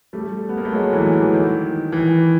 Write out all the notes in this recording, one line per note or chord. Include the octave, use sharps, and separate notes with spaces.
G3 A3
B3
A#3
A3
F#3 G#3
E3 F#3
E3
D#3
E3